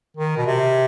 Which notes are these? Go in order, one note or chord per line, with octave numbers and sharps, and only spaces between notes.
D#3
B2
C3